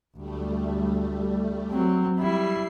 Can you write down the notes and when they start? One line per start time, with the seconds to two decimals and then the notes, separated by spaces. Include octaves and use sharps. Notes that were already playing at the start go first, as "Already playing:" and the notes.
0.16 D2 G3 A3
1.70 F#3 C4
2.19 G3 E4 C7